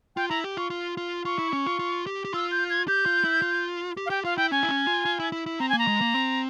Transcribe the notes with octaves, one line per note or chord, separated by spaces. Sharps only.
F4 G5
E4 A#5
G4
F4 C#6
F4
F4
F4 C#6
E4
C#4
F4
F4
G4
G4
F4 E6
G6
G#6
G4 G6
F4
E4
F4
G4
F5
G4 G5
F4 F5
E4 G5
C#4 G#5
E4
C#4
F4
F4
E4
E4
E4
C4 A#5
A#3 G#5
A#5
G#3
A#3
C4